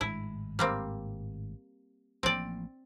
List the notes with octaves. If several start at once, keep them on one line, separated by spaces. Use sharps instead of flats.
G#1 A2 G#3 E4
G3 A#3 C4
A1 F3 A#3 C4 D5